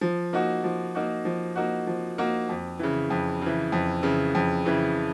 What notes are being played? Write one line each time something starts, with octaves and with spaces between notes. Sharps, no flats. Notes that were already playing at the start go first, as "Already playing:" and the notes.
F3
A#3 D#4 F#4
F3
A#3 D#4 F#4
F3
A#3 D#4 F#4
F3
A#3 D#4 F#4
F2
C#3 E3
F2
C#3 E3
F2
C#3 E3
F2
C#3 E3